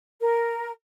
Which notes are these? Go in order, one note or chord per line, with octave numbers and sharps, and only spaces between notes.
A#4